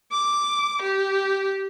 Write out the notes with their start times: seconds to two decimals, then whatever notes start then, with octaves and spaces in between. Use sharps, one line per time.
0.12 D6
0.82 G4